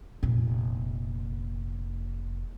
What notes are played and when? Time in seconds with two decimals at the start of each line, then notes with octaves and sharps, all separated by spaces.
0.23 F1 A#2